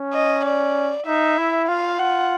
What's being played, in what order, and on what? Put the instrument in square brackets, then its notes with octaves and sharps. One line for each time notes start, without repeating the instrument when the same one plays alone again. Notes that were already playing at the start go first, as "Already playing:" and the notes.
Already playing: [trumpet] C#4
[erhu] D#5
D5
[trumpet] D#4 [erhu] E5
[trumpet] E4
[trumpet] F4 [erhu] F5
[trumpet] F4 [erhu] F#5